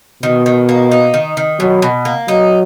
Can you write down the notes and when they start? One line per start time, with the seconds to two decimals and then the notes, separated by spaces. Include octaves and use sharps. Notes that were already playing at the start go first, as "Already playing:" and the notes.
0.23 B2 D#3
0.46 D#3
0.69 A#3
0.91 D#4
1.14 D#3
1.37 D#3
1.59 B2 F#3
1.82 B2
2.05 A#3
2.28 F#3 D#4